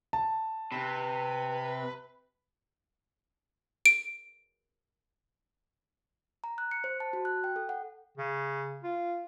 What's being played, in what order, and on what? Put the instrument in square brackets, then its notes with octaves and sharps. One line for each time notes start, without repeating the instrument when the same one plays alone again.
[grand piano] A5
[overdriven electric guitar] C3 [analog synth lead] B4
[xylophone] D7
[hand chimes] A#5
F#6
C#7
C5
A5
F#4
F#6
G5
A4
F#5
[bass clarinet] C#3
F4